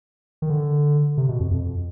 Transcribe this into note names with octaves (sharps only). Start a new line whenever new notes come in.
D#3
D3
C3
B2
F2
F2